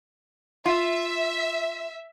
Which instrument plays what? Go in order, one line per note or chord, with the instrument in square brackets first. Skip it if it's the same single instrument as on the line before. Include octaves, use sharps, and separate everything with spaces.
[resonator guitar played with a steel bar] F4 [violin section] E5